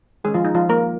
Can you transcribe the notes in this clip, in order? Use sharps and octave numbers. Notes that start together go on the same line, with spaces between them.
D#3 G#3 C#4 G#4
F3 F4
D#4
F3 F4
A#3 A#4